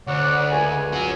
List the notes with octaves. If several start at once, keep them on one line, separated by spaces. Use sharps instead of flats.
D2 C#5 D5 F#5
C#2 G#5
C#4 F#4